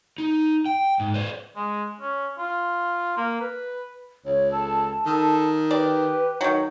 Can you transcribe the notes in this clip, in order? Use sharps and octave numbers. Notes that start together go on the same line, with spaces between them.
D#4
G5
G#2
B4 C5 D5
G#3
C#4
F4
A#3
B4
C#2 C#5
A4 A5
D#3 A4
G4 B4 D5
D#3 F#3